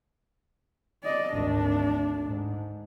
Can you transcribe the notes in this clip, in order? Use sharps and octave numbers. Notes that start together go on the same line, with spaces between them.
D5 D#5
G#1 D2 A3 D4
G#2